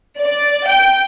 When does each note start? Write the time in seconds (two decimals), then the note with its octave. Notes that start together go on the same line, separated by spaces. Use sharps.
0.21 D5
0.67 G5